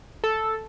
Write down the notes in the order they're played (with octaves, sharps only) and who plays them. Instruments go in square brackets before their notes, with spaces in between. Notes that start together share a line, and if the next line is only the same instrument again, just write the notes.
[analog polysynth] A4